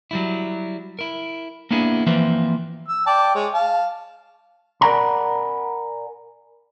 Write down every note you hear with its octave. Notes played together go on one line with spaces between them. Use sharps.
F#3 G3 E4
E4 A#4
A#3 B3 D4 E4 G#4
E3 F3 A#3 C4 B4 E5
E6
D5 G5 A5
G#3 C#5
F5 A5
A#4 D5 F#5 G#5 A#5 B5